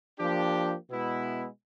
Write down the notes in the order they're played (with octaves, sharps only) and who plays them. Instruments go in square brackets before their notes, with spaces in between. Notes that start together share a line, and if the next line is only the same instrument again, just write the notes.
[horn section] F3 A#3 D4 G4
B2 G#3 B3 E4